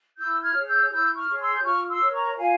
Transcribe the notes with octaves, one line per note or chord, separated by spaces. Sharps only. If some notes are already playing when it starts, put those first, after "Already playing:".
E4 E6 G6
F6 G#6
G#4 C#5
E6 G6
E4 E6 G6
C#6 F6
G#4 C#5
C6 E6
G6
F4 C#6 F6
C6 E6
A#4 C#5
A#5 C#6
F4 F5 G#5